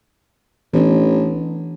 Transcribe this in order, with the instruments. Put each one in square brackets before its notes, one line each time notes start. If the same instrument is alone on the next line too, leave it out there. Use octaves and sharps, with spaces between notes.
[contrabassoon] A1 [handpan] E3 B3 D4